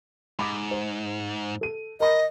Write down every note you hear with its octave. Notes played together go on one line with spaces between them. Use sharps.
G#2 B5 D6
C5
A4 D#7
A#4 D#5 B5